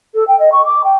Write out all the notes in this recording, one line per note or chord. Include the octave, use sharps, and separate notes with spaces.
A4
G5
D#5
C#6
D6
G5